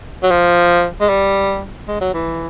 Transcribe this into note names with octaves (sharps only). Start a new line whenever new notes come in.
F#3
F3
G#3
G3
G#3
F#3
E3